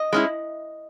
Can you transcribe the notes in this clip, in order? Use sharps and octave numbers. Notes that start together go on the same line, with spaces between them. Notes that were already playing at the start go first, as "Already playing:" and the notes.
Already playing: D#5
G#3 C#4 E4